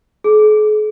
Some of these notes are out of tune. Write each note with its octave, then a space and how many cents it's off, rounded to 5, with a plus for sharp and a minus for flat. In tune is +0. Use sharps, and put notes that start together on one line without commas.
G#4 +45